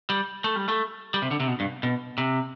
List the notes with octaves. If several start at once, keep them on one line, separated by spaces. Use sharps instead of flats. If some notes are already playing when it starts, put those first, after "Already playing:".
G3
A3
G3
A3
G3
C3
D3
C3
B2
G2
B2
C3